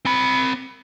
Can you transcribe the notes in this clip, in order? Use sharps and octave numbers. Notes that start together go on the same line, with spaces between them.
C4 B5